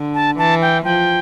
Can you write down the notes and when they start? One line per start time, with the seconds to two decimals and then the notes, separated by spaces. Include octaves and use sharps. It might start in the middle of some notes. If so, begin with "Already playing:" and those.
Already playing: D3
0.14 A5
0.38 E3 A5
0.62 G5
0.85 F3 G5